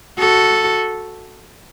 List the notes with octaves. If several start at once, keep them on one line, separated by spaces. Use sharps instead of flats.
F#4 A4